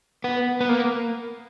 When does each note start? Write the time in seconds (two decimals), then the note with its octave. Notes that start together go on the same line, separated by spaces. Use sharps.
0.24 B3
0.61 B3
0.69 A#3